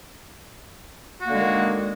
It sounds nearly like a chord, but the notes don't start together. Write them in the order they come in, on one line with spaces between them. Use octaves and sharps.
F#4 A#3 D3 G#3 D#3